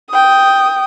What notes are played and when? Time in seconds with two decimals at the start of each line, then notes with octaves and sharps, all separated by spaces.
0.10 G5 D#6